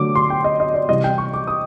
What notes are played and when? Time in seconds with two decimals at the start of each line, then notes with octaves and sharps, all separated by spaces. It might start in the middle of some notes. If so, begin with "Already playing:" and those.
Already playing: D3 F#3 A3 D6
0.15 C6
0.30 G5
0.44 D#5
0.60 D#5
0.74 D5
0.88 C3 E3 G3 D#5
1.04 G5
1.18 C#6
1.34 D6
1.47 D#6